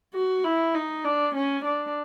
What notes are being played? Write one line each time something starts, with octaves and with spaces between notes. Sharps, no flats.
F#4
E4
D#4
D4
C#4
D4